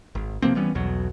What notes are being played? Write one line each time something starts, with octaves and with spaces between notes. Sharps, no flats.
G#1
C3 F3 A#3 C4
E3 G3 B3 C#4
B1 E2 B2 F#3